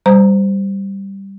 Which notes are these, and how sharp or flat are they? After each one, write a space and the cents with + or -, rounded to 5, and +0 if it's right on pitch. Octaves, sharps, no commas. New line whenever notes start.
G3 +0 C5 -20 A#5 +5